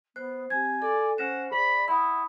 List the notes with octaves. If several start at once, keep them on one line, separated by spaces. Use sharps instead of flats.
B3 C5 F#6
C4 G4 G#5 G#6
A4 D5
C#4 C5 F#5 F6 A#6 E7
G#4 D5 B5
E4 F#5 B5 C6 D#6